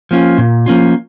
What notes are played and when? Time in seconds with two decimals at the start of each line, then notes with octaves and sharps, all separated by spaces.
0.11 F3 A#3 C#4 F4
0.38 A#2
0.66 F3 A#3 C#4 F4